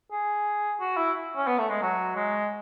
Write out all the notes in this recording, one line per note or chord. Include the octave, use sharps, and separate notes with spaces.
G#4
F#4
E4
C#4
B3
A3
G#3
F#3
G#3